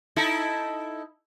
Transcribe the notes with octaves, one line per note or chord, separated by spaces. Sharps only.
D#4 E4 A4